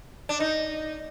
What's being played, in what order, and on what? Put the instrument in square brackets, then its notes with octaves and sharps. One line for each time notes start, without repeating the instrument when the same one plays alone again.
[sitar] D4
D#4